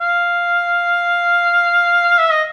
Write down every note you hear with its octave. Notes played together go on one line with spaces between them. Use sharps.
F5
E5
D#5